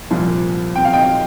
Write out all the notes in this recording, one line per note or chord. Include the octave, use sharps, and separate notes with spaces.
C2 A#2 F3
G5
F5
D#5 G5